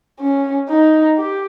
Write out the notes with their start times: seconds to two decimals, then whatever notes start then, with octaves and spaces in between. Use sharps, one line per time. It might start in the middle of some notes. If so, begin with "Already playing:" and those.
0.20 C#4
0.68 D#4
1.17 G4